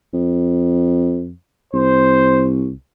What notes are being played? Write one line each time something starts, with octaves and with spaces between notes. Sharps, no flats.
F2
C2 C5